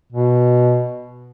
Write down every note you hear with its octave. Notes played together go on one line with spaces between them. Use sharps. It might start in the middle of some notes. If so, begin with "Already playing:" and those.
B2